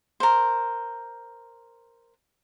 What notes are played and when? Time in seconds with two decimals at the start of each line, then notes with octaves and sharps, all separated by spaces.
0.20 A#4 C5